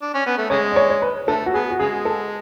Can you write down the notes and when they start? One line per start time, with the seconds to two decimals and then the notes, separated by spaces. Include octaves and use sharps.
0.02 D4
0.14 C#4
0.26 B3
0.37 A3
0.50 C#3 G#3 C#5
0.72 D5
0.76 C#5
0.90 C#5
1.02 B4
1.28 D3 A3 A4
1.46 F#4
1.54 B3 G#4
1.71 F#4
1.79 C#3 G#3 G#4
2.05 A4